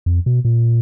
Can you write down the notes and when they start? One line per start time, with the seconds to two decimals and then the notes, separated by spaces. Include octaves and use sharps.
0.06 F2
0.26 B2
0.45 A#2